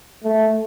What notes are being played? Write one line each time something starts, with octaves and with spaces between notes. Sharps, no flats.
A3